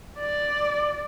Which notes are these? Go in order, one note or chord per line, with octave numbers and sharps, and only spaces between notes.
D5